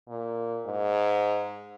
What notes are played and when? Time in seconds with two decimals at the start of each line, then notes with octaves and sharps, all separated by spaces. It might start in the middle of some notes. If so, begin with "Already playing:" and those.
0.09 A#2
0.66 G#2